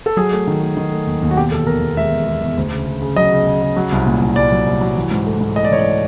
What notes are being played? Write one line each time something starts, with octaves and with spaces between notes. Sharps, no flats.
A4
F#3 G#4
A3
D#3
A3
D#3
A3
D#2
D#2
F#4
B2 G4
E2 A4
E2 A#4
E2
G#3 E5
E2
G#3
E2
D2
C#3
C#3
C#3
F#3 D#5
C#3
C#3
C#3
F#3
C2
A#2
C2
C2 D5
F#3
C2
F#3
E3
G#2
A3
G#2
A3 D#5
D5
E3 C#5
D5